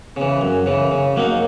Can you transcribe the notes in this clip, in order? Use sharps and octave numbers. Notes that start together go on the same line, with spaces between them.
C#3 E3
F#2
C#3 E3
C#3
F#3 A#3 D#4